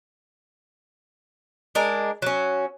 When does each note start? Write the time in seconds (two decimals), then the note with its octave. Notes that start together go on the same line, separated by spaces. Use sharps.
1.75 G#3 D4 A#4
2.22 F#3 C#4